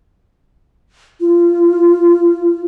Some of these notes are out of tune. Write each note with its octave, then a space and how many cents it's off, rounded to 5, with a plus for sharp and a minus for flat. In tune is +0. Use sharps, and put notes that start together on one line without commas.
F4 -25